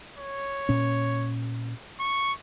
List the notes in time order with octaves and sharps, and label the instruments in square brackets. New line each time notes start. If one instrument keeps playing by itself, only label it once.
[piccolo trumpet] C#5
[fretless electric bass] A#2 C#4
[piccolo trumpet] C#6